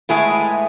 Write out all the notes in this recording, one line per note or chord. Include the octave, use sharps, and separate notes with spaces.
A2 G#3 B3 E4 G#4